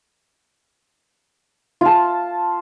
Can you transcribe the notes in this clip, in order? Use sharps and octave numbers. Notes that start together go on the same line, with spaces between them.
F4 A5